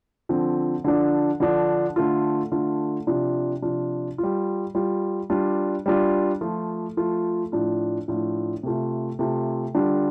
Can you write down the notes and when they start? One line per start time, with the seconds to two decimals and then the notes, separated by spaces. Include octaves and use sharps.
0.29 D3 F3 C4
0.84 D3 F3 D4
1.40 D3 F3 D4
1.96 D3 A3 F4
2.52 D3 A3 F4
3.07 C3 F3 D4 F4
3.62 C3 F3 D4 F4
4.18 G3 F4
4.75 G3 F4
5.30 G3 D4 F4
5.86 G3 D4 F4
6.41 F3 A3 F4
6.97 F3 A3 F4
7.52 A2 F3 D4 F4
8.08 A2 F3 D4 F4
8.63 C3 A3 F4
9.19 C3 A3 F4
9.75 D3 G3 D4 F4